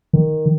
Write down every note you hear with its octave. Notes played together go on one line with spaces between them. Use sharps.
D#3